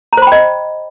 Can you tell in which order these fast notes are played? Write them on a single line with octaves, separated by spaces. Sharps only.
A#5 C5 B5 G5 D#5